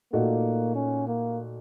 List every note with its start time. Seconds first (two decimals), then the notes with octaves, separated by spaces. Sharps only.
0.13 A#2 A3 A#3 D#4 F#4
0.75 C#4
1.07 A#3